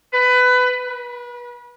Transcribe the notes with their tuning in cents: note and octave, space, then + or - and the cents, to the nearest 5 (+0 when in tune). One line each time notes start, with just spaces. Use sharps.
B4 +20
B4 -30